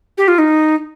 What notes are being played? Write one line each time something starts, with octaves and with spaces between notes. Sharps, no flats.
G4
F4
D#4